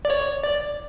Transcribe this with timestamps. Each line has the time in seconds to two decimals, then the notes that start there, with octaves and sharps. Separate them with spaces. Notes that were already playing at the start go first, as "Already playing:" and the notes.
0.05 D5
0.10 C#5
0.44 D5